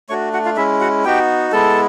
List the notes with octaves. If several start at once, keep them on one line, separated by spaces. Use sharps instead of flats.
A3 D4 F#4 C#5 C#6
F#4 F#5
F4 F5
G#3 C#4 E4 E5
F#4 F#5
B3 D#4 F#4 G4 G5
G#3 B3 E4 A4 A5